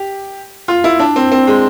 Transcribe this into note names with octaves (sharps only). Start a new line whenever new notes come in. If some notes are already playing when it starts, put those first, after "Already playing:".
Already playing: G4
F4
E4
D4
C4
C4
G#3